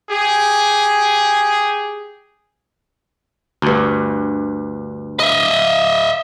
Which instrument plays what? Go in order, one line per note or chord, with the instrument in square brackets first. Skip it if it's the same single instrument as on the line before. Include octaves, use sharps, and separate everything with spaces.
[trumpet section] G4 G#4
[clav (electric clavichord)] D2 G2
[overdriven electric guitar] D#5 E5